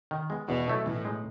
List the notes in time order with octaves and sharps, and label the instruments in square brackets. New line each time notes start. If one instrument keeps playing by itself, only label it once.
[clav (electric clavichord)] D#3
G#3 B3
[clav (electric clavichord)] E2 [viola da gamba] B2
[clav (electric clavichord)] B2 F#3 A3 E4
[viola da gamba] A2 [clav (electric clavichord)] E3
[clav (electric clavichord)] G#3 D#4